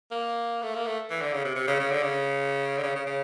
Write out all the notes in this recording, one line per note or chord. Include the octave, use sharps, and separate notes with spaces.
A#3
A3
A#3
A3
E3
D3
C#3
C3
C3
C#3
C#3
D3
C#3
D3
C#3
C#3
C#3